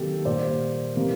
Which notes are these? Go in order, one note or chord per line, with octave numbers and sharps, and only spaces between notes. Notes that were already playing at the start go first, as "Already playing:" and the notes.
Already playing: C3 D#3 F#3 A#3 G4 A4
A#2 G3 A#3 C5 D5
C3 E3 G3 A#3